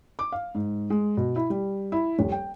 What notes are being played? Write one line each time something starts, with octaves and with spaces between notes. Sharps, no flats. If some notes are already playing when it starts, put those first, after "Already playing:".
D6
F5
G#2
G#3
B2
E4
G3
E4
D#1
G5